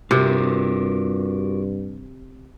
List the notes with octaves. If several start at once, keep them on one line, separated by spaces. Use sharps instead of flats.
G2 C3 F4 F#4 A#4